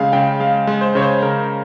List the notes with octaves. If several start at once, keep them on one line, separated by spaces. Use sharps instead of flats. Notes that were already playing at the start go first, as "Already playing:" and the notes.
Already playing: C#3 G#3 F5
C#3 G5
G#3 F5
G#3
C5
C#3 C#5
C5
C#3 A#4